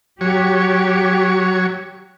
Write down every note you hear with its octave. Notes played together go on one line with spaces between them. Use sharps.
F#3 G4 C#5